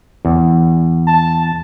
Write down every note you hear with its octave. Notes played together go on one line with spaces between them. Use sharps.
E2
A5